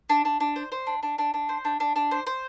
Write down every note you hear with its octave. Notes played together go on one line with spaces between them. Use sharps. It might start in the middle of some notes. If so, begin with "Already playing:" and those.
D4
D4
D4
C5
C5
D4
D4
D4
D4
C5
D4
D4
D4
C5
C5